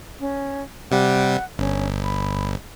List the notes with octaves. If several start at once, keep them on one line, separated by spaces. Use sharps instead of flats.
C#4
C3 G3 F#5
G1 C#4
B5